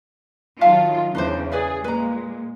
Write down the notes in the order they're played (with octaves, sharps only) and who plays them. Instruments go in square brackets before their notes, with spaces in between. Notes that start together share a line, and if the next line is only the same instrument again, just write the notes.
[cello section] D#3 F#3 F4 [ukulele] E5 F5 A5
[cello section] E2 C#3 [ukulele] D4 F4 C5
[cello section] G#4 [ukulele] B4 D5 E5
[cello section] A#2 G#3 [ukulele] B4 A#5